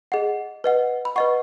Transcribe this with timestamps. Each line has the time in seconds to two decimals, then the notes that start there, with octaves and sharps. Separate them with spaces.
0.12 G#4 D#5 F#5
0.64 B4 D#5 F#5
1.05 B5
1.16 B4 D#5 F#5 C#6